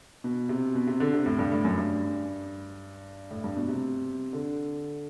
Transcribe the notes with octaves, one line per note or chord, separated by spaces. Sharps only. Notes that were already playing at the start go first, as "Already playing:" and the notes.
B2
C3
B2
C3
D3
C3
A2
G2
A2
F#2
G2
A2
G2
B2
C3
D3